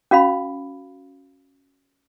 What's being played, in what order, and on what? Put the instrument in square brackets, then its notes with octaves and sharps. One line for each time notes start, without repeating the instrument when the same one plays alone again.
[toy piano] C#4 F#4 F5 B5